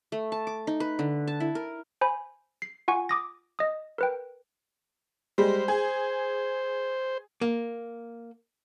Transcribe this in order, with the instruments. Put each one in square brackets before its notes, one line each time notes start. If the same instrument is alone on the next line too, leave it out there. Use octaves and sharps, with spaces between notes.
[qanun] A3
A5
D6
D#4
B4
D3
A5
E4
A#4
[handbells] C5 G#5 B5
C7
F4 F#5 G#5 C#6
D6 D#6 A#6
D#5 D#6
A#4 B4 G5
[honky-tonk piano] G3 G#3 [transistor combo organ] C5
[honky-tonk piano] G#4
[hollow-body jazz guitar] A#3